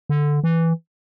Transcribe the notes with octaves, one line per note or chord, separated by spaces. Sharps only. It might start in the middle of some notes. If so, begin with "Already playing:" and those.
D3
E3